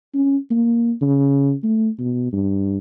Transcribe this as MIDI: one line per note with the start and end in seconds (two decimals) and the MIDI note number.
0.14 0.37 61
0.51 0.92 58
1.02 1.53 49
1.63 1.89 57
1.99 2.29 47
2.33 2.78 43